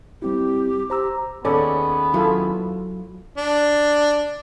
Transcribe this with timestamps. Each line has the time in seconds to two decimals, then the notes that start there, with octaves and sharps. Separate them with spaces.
0.22 G3 C4 E4 G4
0.90 G4 C5 A#5 E6
1.45 D#2 B3 C#4 G#4 A4 D5
2.14 F#3 E4 F4 A4
3.37 D4